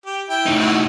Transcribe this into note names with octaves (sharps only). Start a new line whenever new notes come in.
G4
E4 G5
A2 D#4
E4 F#4